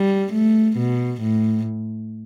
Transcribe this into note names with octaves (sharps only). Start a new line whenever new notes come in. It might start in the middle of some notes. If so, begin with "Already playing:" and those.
Already playing: G3
A3
B2
A2